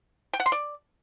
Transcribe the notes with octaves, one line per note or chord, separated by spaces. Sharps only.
G5
F#5
C6
D5